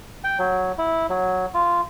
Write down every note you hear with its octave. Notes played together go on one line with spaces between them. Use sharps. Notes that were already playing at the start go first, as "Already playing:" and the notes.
G5
F#3
E4
F#3
F4